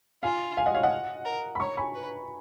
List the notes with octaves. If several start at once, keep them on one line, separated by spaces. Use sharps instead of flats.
F4 F5 G#5
F5 G#5
D#5 F#5
C#5 F5
D#5 F#5
A#4
B5
C#5 A#5 C#6
G#5 B5
B4